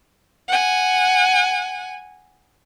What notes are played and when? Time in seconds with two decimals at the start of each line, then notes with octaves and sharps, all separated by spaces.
0.48 F#5 G#5